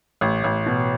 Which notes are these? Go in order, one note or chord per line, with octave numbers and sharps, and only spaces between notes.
A1
A1
B2